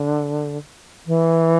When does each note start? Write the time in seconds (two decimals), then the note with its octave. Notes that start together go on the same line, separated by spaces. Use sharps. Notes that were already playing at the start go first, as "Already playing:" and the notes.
Already playing: D3
1.07 E3